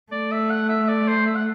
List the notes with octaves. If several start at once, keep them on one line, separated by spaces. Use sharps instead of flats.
A3 D5
E5
F#5
E5
D5
C5
E5
F#5